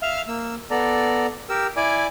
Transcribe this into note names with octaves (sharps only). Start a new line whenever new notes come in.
E5 F5 F6
A#3 E6
B3 A4 D5 A#5
G4 A#4 E6
E4 D5 G#5 D6